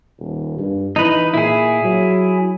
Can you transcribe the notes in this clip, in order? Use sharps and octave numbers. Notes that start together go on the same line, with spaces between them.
D#1
G2
E3 D#4 B4
A#2 E4 G#4
F#3